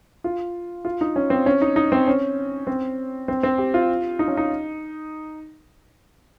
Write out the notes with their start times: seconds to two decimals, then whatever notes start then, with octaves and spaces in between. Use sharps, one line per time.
0.24 F4
0.85 F4
1.01 D#4
1.16 C#4
1.30 C4
1.46 C#4
1.62 D#4
1.76 D#4
1.92 C4
2.07 C#4
2.67 C4
3.28 C4
3.43 C4
3.58 G4
3.74 F4
4.19 D#4
4.28 C#4
4.37 D#4